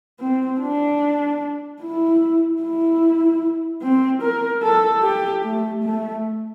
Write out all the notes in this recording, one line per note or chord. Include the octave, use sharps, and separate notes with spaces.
C4
D4
E4
E4
C4
A#4
A4
G4
A3
A3